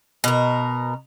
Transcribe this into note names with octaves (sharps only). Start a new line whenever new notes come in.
B2 A#4